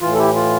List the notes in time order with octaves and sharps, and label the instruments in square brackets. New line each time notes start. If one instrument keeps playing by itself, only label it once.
[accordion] A2 E3 F4
A4
E4 G4
F4